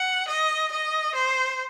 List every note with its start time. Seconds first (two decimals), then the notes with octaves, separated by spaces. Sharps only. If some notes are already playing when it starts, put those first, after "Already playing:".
Already playing: F#5
0.28 D#5
0.72 D#5
1.15 C5